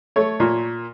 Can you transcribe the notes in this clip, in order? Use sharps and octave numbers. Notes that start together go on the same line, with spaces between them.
A3 C#5
A#2